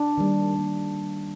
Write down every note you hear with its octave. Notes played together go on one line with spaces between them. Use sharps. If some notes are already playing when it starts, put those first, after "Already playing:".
Already playing: D4
D#3 G3 A#3
D#3 G3 A#3